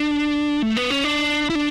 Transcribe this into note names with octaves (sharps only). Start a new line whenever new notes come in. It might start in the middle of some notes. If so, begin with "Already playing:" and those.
Already playing: D4
A3
B3
C#4
D4
E4
D4